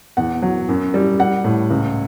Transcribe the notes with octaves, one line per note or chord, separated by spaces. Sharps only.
E2 F#5
F#3
F#2
G3
G3 F#5
A2
C#2